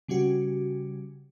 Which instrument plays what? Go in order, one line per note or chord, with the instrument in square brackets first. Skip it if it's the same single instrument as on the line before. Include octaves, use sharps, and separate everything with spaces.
[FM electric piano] C#3 G3 C#4 F#4 G4